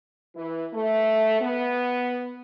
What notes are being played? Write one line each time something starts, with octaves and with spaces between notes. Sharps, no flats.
E3
A3
B3